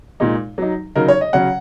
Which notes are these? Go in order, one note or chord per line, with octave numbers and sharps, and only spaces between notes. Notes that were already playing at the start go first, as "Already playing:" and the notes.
A#2 G#3 D#4
F#3 D#4
C#3 F#3 D#4 A#4
C#5
D#5
C#3 F#3 C#4 F#5